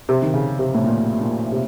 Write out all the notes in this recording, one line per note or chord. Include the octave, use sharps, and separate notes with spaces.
C3
D#3
C#3
C3
A2
A#2
A#2
C3